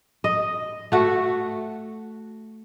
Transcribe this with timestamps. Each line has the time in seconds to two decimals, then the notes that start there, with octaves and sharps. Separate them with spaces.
0.24 D#5
0.92 A3 F#4